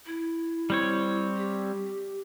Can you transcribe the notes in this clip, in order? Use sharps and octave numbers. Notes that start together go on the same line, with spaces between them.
E4
G3 C4 C#5
G4